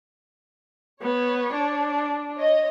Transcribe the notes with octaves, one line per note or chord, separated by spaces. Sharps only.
B3 C#5
D4
C#5 D#5